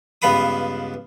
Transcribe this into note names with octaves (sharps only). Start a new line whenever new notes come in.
C#2 G2 B3 F5 B5 D#6